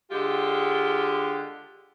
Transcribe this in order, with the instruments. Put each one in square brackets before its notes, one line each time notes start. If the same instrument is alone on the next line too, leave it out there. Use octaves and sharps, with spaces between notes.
[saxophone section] D3 G#3 F4 G4